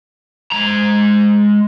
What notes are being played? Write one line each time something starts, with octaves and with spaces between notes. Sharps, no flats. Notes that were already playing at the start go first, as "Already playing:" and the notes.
G#3 A#5